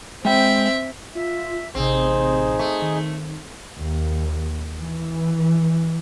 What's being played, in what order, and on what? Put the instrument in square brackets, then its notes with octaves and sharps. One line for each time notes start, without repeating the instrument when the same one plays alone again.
[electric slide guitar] G#3 G5 [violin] C4 E5
[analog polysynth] F4 [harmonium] E5
[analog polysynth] A1 C3 [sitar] C4 [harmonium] D#4 G#4
[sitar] A3
[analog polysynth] D#3
[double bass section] D#2
E3